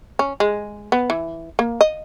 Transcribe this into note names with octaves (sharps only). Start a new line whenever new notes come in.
C#4
G#3
B3
E3
A#3
D#5